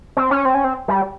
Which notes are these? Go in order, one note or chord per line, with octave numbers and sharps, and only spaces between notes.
C4
C#4
C4
C#4
C4
G3